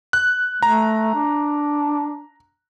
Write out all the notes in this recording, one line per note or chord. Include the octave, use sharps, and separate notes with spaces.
F#6
A3 A#5
D4